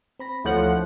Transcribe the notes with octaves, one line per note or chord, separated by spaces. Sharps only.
C4 B5 A#6
D2 F3 E4 A4 C#5 F#5